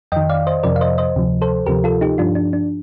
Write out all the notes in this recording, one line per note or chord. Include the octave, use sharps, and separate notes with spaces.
F2 D#3 D#5 G5
D5 F5
C5 D#5
F2 C3 F3 A#4 D5
F5
C5 D#5
C5 D#5
D2 C3 F3
A4 C5
D2 C3 F3 G4 A#4
F4 A4
D#4 G4
G2 F3 D4 F4
D4
D4